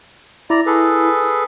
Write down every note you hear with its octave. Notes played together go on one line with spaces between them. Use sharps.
E4 D5 A#5
G#4 A4 B4